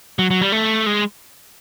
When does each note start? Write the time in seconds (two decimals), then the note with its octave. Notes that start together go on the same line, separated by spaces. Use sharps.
0.19 F#3
0.30 F#3
0.41 G3
0.52 A3
0.86 G#3